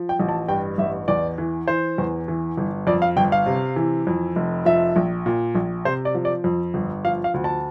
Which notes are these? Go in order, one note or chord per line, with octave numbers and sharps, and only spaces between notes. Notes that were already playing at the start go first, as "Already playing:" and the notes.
Already playing: F3
G5
A1
A5
G2 G5
A1 E5
E2 D5
E3
E3 C5
E2
E3
G1
F2 D5
F5
G1 G5
F5
C3
E3
F2
F1
F3 E5
A#1
A#2
A#1
C3 C5
D5
F3
D5
F2
G1
F3 F5
F5
D2
A5